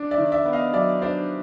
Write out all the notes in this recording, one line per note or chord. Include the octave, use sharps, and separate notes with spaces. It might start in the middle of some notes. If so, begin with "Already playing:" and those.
Already playing: D4
D5 E5
D#3
D5 E5
B3
D#5 F5
F#3 D5 E5
D4 C5 D5